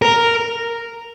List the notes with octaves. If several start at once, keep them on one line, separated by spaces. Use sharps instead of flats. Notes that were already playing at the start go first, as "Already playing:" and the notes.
A#4